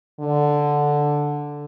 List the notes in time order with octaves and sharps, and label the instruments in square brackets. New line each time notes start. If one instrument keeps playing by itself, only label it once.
[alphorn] D3